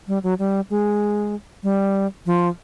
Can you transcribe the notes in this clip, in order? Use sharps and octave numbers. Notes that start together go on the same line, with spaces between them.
G3
F#3
G3
G#3
G3
F3